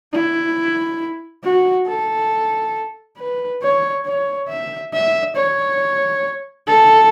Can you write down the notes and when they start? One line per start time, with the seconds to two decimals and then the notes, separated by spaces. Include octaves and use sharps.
0.13 E4
1.44 F#4
1.87 A4
3.18 B4
3.62 C#5
4.06 C#5
4.49 E5
4.93 E5
5.36 C#5
6.67 A4